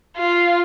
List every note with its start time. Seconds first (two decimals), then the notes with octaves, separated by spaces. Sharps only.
0.17 F4